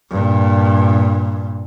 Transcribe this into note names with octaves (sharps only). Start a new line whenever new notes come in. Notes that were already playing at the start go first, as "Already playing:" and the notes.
G2 A#2